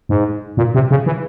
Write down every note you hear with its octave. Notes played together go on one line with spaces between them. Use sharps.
G#2
A#2
C3
C#3
E3